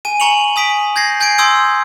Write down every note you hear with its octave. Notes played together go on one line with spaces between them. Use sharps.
G#5 D#7
G#5 A#5 C#6 C#7 F7 F#7
G#5 D#6 B6 D7
G6 G#6 A#6 C7
G#5 G6 G#6 C7 D7
C6 D#6 E6 G6 G#6 D7